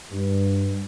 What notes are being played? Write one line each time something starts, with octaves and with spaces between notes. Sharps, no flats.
G2